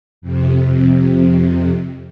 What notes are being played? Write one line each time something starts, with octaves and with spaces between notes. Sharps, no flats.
F2 C3